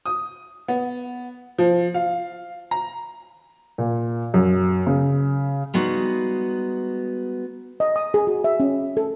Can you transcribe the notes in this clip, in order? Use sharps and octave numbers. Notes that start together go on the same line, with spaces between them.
D#6
B3
F3
F5
A#5
A#2
F#2
C#3
G3 G#3 B3 D#4 F#4
D#5
D#6
G#4
F#4
E5
C#4
A4